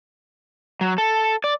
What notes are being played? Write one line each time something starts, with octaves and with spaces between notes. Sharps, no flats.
F#3
A4
D5